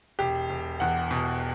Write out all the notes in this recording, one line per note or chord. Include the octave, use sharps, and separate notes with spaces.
E1 G4
E1
E2 F#5
B2